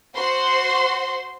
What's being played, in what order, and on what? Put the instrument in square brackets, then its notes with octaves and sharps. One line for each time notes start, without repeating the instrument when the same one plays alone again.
[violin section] F#4 C5 C6